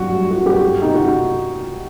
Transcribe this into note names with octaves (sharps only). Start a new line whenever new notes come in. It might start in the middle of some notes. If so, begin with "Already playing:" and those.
Already playing: G2 F#3 F#4
G2
F#4
G2
G4
G3
C3 D#4
F#4